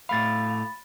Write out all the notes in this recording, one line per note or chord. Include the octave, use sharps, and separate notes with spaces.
A2 A3 F5 B5 A6